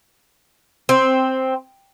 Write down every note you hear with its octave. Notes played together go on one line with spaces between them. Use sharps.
C4